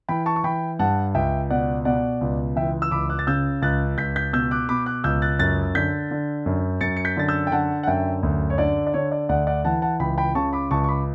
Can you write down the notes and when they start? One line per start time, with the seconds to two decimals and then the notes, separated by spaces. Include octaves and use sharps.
0.09 E3 G5 B5
0.26 A5 C#6
0.36 C#6
0.44 E3 G5 B5
0.79 G2 F#5 A5
1.15 C#2 E5 G5
1.50 B2 D5 F#5
1.85 B2 D5 F#5
2.21 C#2
2.56 E3 E5 G5
2.82 E6
2.91 C#2 B5 D6
3.09 D6 F#6
3.19 A6
3.27 C#3 E6 G6
3.62 C#2 F#6 A6
3.98 C#2 G6 B6
4.16 G6 B6
4.33 B2 E6 G6
4.51 D6 F#6
4.69 B2 B5 D6
4.86 D6 F#6
5.04 C#2 E6 G6
5.22 F#6 A6
5.39 F#2 F#6 A6
5.75 D3 G6 B6
6.11 D3
6.46 F#2
6.81 F#2 A6 C#7
6.97 C#7
7.05 G6 B6
7.17 D3 A6
7.28 E6 G6
7.47 G5
7.52 D3 F#5 A5
7.83 F#5
7.87 F#2 E5 G5
8.23 D2
8.50 C#5
8.58 D3 D5
8.87 D5
8.94 D3 C#5
9.12 D5
9.29 D2 D5 F#5
9.47 D5 F#5
9.64 E3 F#5 A5
9.82 F#5 A5
10.00 C#2 G5 B5
10.18 G5 B5
10.35 C#3 A5 C#6
10.53 B5 D6
10.71 C#2 A5 C#6
10.84 C#6
10.89 B5 D6